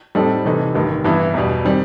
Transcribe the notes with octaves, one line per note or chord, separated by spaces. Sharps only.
A2 G3 C4 D#4 A4
C3 E3 A3 D#4
A1 G2 D#3
G2 E3 B3 E4
E2 B2 G3
D#3 G3 C4